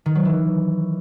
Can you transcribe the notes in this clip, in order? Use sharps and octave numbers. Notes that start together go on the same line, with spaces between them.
D#3
F#3
E3